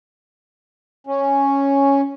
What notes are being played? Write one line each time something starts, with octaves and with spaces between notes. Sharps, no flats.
C#4